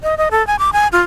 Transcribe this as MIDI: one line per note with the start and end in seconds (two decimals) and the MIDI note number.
0.03 0.17 75
0.18 0.29 75
0.31 0.45 69
0.47 0.56 80
0.59 0.70 86
0.73 0.88 80
0.92 1.03 65